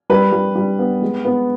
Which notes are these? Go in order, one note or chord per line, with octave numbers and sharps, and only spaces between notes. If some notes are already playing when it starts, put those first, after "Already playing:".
G3 B4
G3
G3
B3
G#3
B3